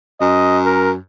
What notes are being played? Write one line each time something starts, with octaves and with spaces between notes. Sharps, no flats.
F#2 D#5
A#4